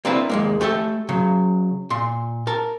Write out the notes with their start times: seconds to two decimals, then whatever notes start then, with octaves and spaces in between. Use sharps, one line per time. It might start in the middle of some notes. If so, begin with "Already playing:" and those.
0.05 A#3 C4 D4 E4 B4
0.30 D#2 G#3 A#3
0.61 A3 G4 A4 E5
1.09 C#3 F#3
1.90 A#2 C6
2.47 A#4 A5